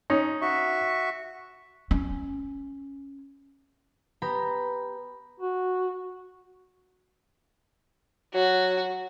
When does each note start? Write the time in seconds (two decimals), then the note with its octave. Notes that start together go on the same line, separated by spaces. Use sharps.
0.10 C#4 D#4
0.41 F#4 E5 C#6
1.91 C#4
4.22 B3 G4 A#5 B5
5.40 F#4
8.34 F#3 F#4